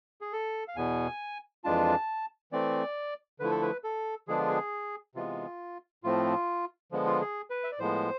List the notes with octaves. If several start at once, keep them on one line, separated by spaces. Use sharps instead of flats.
G#4
A4
F5
E2 B2 B3 G#5
F2 E3 G#3 D4 F4 A5
E3 A3 C4 D5
D3 F3 A3 E4 B4
A4
B4
A4
D3 F3 G#3 B3 D4 G#4
F4
G#4
C3 E3 G#3 B3 F4
A2 F3 A3 C4 F4
D3 F3 G#3 B3
F4
G#4
B4
E5
D5
A2 F3 G#3 B3 C5